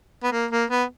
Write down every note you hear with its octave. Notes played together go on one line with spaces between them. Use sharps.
B3
A#3
A#3
B3